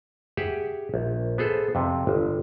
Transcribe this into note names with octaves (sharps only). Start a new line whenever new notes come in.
G4 G#4 E5 F#5
A#1
B3 G#4 A4 C5
F2 C3
G1